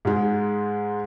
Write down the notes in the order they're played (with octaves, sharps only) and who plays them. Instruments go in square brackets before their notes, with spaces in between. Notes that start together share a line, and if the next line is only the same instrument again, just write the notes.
[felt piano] G#2 G#3